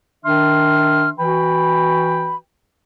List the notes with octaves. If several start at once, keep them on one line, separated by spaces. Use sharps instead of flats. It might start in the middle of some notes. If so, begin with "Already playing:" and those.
D#3 D4 E5 C6 F6
E3 F#4 B4 G5 B5